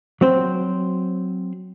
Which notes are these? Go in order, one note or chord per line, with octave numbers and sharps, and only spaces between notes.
F#3 C4 C5